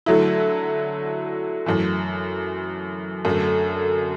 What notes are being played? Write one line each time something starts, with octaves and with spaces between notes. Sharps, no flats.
D3 F#3 A3 E4
F#2 E3 A3
F#2 D3 A3